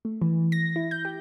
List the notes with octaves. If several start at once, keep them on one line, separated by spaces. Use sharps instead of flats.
A3
E3
A#6
E4
G6
G4